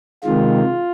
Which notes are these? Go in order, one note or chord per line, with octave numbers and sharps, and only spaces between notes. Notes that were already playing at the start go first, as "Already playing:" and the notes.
C3 D#3 G#3 F4